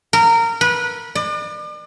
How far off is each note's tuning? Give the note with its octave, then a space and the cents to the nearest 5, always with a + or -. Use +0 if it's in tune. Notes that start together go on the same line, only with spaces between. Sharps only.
A#4 -20
B4 -25
D5 +40